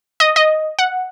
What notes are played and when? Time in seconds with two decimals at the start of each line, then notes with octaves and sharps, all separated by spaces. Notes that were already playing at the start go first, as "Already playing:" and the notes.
0.20 D#5
0.36 D#5
0.79 F#5